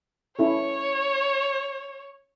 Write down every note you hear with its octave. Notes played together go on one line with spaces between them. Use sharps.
C#4 E4 A4 C#5